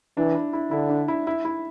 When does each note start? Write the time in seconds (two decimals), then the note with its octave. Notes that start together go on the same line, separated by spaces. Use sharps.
0.17 E3 D4
0.35 E4
0.53 E4
0.71 D3 E4
0.90 D4
1.08 E4
1.27 E4
1.45 E4